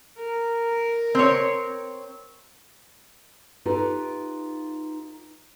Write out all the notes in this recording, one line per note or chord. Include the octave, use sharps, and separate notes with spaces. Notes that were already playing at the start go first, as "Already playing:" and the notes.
A#4
C4 C#5
D#4 F4 G4 A4 B4